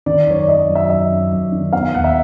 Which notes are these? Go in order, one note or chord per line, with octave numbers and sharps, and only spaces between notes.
D#3 D5
F#2 C#5
D5
F#2 D#5
F#3
E5
F#2 E5
F#2
F#2
D#3
B3 F5
D#2 F#5
E5